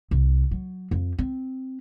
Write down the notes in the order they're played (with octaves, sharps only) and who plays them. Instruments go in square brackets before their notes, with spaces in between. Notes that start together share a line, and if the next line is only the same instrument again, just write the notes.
[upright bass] C2
F#3
F2
C4